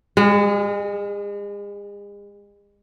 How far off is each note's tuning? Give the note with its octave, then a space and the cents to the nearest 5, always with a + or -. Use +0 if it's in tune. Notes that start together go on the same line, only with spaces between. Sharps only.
G#3 -40 G#4 +10